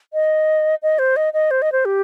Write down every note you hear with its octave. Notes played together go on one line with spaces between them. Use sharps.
D#5
D#5
C5
D#5
D#5
C5
D#5
C5
G4